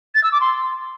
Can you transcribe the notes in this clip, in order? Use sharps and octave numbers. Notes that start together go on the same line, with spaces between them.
A6
E6
D6
C6